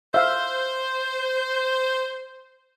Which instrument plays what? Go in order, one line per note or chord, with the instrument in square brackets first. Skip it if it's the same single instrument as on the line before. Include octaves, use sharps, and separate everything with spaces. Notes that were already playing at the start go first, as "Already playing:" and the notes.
[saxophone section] C5 [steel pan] E5 F5